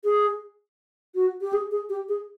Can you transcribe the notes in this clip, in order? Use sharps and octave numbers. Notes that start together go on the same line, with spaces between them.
G#4
F#4
G4
G#4
G#4
G4
G#4